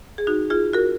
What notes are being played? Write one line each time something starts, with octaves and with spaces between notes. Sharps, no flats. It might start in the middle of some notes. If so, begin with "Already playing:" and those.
G#4
D#4 F#4
F4 G#4
F#4 A#4